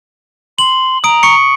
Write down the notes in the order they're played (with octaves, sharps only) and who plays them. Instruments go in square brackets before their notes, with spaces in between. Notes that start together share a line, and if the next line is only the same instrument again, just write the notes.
[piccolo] C6 [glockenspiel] F#7
[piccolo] A#5 [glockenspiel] D#6 D7
[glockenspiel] C#6 C#7